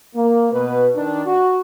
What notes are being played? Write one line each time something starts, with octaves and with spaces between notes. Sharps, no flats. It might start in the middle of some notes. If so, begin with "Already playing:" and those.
A#3
B2 B4
D#3 D4
F#4